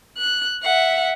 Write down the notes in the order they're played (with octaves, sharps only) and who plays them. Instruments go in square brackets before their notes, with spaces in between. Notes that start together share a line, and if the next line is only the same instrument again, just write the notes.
[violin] F#6
E5 F#5